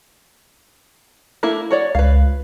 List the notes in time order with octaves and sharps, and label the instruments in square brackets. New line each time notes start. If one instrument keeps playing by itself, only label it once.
[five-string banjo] A3 A#3 E4
F#4 C#5 D5
[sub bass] C#2 [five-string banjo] B4 F5